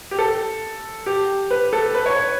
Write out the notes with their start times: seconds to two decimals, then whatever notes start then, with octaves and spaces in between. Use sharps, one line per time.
0.11 G4
0.19 A4
1.06 G4
1.51 B4
1.73 A4
1.95 B4
2.06 C#5
2.16 C#5